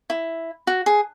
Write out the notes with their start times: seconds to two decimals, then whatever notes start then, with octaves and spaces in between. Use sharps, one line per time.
0.10 E4
0.67 F#4
0.86 G#4